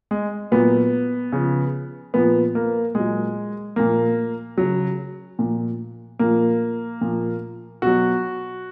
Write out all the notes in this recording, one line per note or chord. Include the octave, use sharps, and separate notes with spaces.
G#3
A#2 F#3 B3
C#3 F3
A#2 F3 B3
A#3
A#2 F#3 G#3
A#2 F3 A#3
C#3 F#3
A#2 F3
A#2 F3 A#3
A#2 F3
B2 F#3 F#4